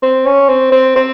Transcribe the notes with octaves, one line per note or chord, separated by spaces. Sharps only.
C4
C#4
C4
C4
C4